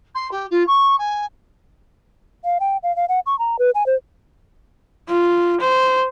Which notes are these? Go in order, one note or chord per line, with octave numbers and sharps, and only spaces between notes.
C6
G4
F4
C#6
G#5
F5
G5
F5
F5
F#5
C#6
A#5
B4
G#5
C5
F4
C5